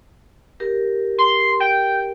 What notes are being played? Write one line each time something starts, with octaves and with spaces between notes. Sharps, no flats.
G4 A#4
C6
G5